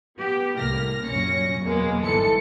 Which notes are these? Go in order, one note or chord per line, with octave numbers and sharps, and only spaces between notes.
B3 G4
C2 A2 A#3 F6 A#6
C2 F#2 A#2 C#4 A#6 C#7
E2 B2 F#3 G#3 A#3
G1 G#2 E3 A4 C#7